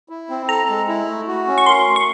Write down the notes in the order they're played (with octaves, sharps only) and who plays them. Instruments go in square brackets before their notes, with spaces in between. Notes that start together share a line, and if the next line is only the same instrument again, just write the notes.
[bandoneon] E4
C4
[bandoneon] A4 [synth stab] A#5
[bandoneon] G#3
E4
A3
F#4
C#4
[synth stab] C#6
[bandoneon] A#4 [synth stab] C6
[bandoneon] A3
[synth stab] C#6